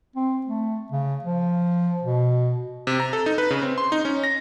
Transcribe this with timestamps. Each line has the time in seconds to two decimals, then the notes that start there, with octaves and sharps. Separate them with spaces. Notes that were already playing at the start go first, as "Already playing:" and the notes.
0.16 C4
0.47 A3
0.92 C#3
1.25 F3
2.03 B2
2.87 C3
3.00 A#5
3.13 A4
3.26 D#4
3.38 B4
3.50 C#3
3.62 C4
3.78 C6
3.92 D#4
4.05 C#4
4.24 A#6